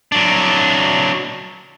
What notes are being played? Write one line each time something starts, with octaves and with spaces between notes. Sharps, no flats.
F#3 D4